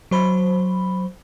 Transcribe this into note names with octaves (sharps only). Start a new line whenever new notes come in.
F#3 C5 B5